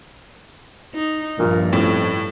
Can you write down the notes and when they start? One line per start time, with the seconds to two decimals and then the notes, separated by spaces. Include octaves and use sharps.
0.94 D#4
1.39 A#1 G2 A#2 F3
1.73 F2 A2 C#4